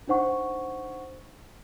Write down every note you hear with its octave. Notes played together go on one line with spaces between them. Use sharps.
D4 D#4 C5 F#5 C#6